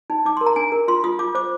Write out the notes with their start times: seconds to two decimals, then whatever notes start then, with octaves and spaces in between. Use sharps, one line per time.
0.10 D#4
0.25 D#4 D6
0.37 A#4 C6
0.46 A#5
0.56 D4 G#5
0.72 A#4
0.88 F4 C6
1.04 F4 D#6
1.19 F4 D6
1.35 C5 D6